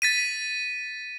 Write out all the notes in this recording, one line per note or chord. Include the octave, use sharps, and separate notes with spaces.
A6 B6 D#7